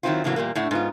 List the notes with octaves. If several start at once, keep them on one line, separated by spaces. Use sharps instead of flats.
D#3 F#3 G#3 C4 E4 F4
A2 C#3 E3 F#3 A#3 B3
E2 A#2 G3 A#3
A2 A3 D4 F#5
G#2 B3 F4